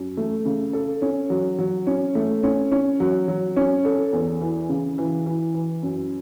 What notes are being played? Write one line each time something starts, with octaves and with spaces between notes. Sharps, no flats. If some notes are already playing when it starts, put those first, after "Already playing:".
Already playing: F#2
A3
C#3
A4
C#4
F#3
F#3
C#4
A3
C#4
C#4
F#3
F#3
C#4
A4
E2
E3
C#3
E3
E3
E3
F#2